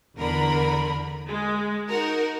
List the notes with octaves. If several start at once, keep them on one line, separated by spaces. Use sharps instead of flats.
E2 D3 A#4 B5
G#3
D#4 F#4 A#4